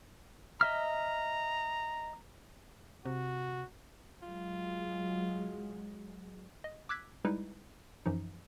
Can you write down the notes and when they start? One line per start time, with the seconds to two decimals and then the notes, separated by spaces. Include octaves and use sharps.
0.61 D#5 E5 A#5 F6
3.06 C3 F#4
4.22 F#3 G#3 F4
6.64 D#5
6.89 D6 E6 F#6 G#6 B6
7.25 G3 G#3 D#4 E4 B4
8.06 F#2 E3 F3 D#4